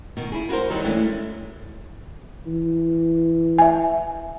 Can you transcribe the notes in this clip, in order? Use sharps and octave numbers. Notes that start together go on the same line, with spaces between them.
B2 D#3
E4 G#4
E4 F#4 G4 A#4 C5
D#3 F#3 G3 D#4 E4 B4
E3 G#3 A3 C#4 D4
E3
E5 G#5